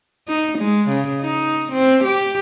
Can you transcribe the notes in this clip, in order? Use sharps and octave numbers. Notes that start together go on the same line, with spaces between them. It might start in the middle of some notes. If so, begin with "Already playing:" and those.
D#4
G#3
C#3
D#4
C4
G4